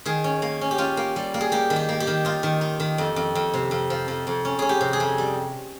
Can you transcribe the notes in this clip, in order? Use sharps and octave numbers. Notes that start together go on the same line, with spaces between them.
D#3 G#4
C#4
A#3
C#4
G4
C#4 F4
A#3
G3
A#3
G#4
A#3 G4
D#3
G4
A#3
G4
D#3
D#4 F4
D#3
D#4
D#3
F2
F2
F2
C3
F2
F3
F2
F2
C#4
C#4 G#4
G4
C3
G#4
F2
G3